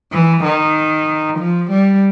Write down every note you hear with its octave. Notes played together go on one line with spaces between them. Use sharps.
E3
D#3
F3
G3